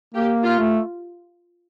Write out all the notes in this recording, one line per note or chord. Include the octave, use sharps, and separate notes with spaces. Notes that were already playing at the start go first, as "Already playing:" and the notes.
A#3 G4
F4
A3